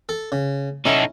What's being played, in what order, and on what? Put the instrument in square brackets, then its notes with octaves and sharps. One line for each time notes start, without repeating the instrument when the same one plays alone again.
[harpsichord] A4
C#3
[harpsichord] C#4 E4 [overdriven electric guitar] D#4 A4